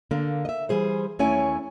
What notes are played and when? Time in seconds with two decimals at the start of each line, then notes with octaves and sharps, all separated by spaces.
0.11 D3 A#3
0.45 D#5 E5
0.69 E3 G3 G#4 C5
1.19 D#2 A3 C#4 E4 C#5 G#5